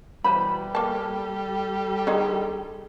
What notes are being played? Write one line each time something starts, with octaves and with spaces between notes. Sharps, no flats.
B2 E3 G3 B4 C5 B5
A#3 A4 A5
D3 D#3 D#4 G#4